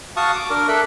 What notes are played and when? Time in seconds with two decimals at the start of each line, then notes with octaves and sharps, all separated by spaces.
0.17 F#4 F5 A5 C#6 D#6
0.35 D6
0.50 D4 A#4
0.68 A4 E5 F#6